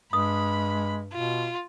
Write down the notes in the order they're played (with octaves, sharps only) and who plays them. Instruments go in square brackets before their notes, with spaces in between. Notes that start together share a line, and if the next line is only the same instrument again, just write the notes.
[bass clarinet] G2 [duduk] G#3 [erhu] B5 [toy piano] D#6
[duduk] B2 [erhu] F4